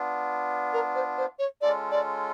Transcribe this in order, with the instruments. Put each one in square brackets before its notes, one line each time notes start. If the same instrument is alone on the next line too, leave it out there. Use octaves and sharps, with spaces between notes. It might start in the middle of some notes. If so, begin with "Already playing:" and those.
Already playing: [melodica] B3 D4 F4
[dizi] A#4
C5
C5
C#5
[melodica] G#3 C#4 F4 A4 [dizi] D5
[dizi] D5